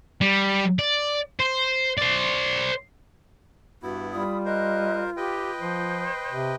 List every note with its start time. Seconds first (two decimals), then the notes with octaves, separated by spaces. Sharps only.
0.21 G3
0.79 D5
1.40 C5
1.98 C5 D5
3.83 G2 B3 E4 F#4
4.11 G3 F4 B5 D#6
4.45 A#4 C5 D#5 F#6
5.17 G4 B4 D#5 G5
5.60 F3 C5
6.31 C3